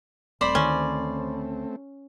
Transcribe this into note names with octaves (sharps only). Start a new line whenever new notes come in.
D#1 A3 C4 C5 D5 B5
D2 D#3 C#4